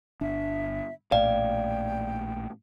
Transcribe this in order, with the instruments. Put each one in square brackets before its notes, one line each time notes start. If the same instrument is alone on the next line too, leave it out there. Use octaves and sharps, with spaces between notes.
[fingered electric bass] G1 D4 [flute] E5
[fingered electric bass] A#1 A2 [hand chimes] D5 [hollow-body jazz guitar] F5 [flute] G5